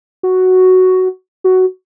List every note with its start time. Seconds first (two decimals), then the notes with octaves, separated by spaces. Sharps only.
0.23 F#4
1.44 F#4